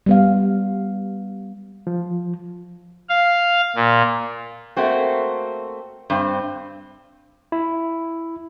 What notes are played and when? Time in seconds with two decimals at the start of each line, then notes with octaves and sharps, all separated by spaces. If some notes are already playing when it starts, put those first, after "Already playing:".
0.06 G3 B3 F5
1.87 F3
3.09 F5
3.76 A#2
4.77 A3 A#3 C4 F#4
6.10 G2 C4
7.52 E4